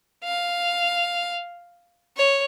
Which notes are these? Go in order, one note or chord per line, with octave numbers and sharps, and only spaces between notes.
F5
C#5